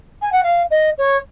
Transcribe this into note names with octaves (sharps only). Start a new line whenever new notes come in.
G#5
F#5
F5
D#5
C#5